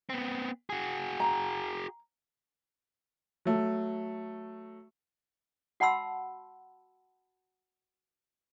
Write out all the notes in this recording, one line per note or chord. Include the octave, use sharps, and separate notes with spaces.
B3 C4
F#4 G#4
A#5
F#3 A3
F#4 F#5 A5 B5 C6 E6